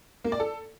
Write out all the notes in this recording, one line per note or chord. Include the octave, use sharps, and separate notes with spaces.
A#3
D5
A4